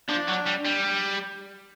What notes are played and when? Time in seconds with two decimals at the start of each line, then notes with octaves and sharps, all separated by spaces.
0.09 F3 D4
0.28 F#3
0.47 G3
0.65 G3